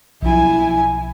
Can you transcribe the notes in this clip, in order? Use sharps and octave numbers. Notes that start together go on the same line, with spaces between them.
B1 F3 E4 G#5